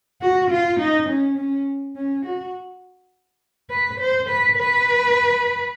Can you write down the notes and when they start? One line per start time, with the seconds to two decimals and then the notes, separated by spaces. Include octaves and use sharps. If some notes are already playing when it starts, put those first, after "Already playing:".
0.22 F#4
0.51 F4
0.80 D#4
1.09 C#4
1.38 C#4
1.96 C#4
2.26 F#4
3.71 B4
4.00 C5
4.29 B4
4.58 B4